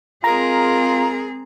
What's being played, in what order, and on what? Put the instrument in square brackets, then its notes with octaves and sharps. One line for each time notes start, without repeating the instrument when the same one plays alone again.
[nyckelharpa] G#3 A#4 [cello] C4 G#4 [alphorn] F4 [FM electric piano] A#5